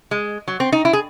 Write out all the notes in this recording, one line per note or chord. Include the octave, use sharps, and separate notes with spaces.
G#3
F#3
C4
D#4
E4
G#4